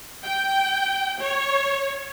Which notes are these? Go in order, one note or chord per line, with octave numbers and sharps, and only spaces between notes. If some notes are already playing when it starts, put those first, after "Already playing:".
G5
C#5